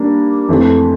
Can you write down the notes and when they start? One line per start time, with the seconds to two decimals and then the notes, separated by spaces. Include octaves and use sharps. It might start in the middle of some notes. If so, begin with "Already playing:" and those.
Already playing: G3 A#3 D4
0.49 F2 E3 A3